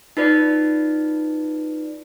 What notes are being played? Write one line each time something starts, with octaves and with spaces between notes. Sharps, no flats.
D#4 F4 B4 D5